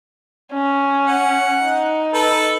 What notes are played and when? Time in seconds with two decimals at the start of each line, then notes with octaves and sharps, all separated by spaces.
0.53 C#4
1.05 F#5
1.63 D#4
2.13 A4 B4